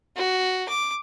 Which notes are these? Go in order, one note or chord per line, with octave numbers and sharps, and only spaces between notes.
F#4
D6